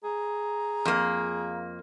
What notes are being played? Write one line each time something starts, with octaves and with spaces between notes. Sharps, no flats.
G#4 A#5
F2 A#3